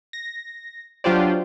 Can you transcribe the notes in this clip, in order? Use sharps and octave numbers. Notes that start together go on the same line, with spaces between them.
A#6
F#3 D4 F4 G4 C5 D5